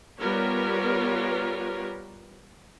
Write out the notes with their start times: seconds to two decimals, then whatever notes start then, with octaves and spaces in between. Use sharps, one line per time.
0.19 G3 B3 F4 A#4 B4 C#5